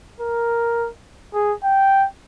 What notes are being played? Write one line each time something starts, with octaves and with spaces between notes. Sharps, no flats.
A#4
G#4
G5